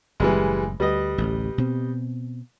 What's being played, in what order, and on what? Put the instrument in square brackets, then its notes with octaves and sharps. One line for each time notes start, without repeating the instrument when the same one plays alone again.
[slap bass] F#1 A2 [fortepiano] E3 G3 G#3
[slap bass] D2 [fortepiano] G3 B4 D#5
[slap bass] A1 D2 A2
B2 C4